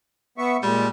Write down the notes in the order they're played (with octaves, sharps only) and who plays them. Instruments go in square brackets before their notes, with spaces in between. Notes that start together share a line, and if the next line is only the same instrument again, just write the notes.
[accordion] B3 E5 C#6
[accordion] A#2 G#3 [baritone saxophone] G3